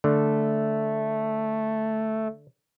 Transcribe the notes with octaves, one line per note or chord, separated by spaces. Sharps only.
D3 A3